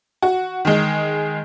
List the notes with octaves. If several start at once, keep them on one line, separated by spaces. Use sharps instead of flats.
F#4
D#3 G#3